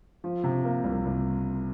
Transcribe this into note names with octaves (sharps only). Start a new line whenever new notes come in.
F3
C3
A#3
C2
C2